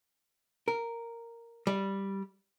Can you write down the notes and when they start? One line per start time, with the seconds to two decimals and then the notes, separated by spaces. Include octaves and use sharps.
0.68 A#4
1.67 G3